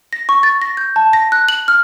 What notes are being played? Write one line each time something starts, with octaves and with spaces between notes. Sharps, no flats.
A#6
C#6
A6
A#6
G6
A5
A#6
F#6
F#7
F6